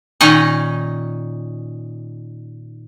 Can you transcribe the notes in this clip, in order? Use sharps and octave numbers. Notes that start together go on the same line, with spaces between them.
A#2 D#3 C#4 D#4 D#5